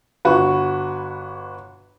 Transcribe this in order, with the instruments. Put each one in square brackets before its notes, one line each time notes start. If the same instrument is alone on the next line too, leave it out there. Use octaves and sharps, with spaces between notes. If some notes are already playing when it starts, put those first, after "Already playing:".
[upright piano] G1 F#4 B4